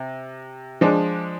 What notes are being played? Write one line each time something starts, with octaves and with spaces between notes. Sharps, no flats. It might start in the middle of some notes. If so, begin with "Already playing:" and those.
Already playing: C3
F3 G#3 D4